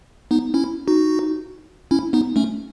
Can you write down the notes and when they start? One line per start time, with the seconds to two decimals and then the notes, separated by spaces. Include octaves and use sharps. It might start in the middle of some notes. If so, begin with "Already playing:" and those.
0.31 B3 D#4
0.54 C#4 E4
0.88 D#4 F#4
1.91 C#4 E4
2.13 B3 D#4
2.36 A3 C#4